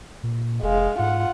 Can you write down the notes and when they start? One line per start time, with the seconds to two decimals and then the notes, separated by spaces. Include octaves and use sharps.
0.23 A#2
0.62 F1 G#3 F5
0.99 G#2 F4 F#5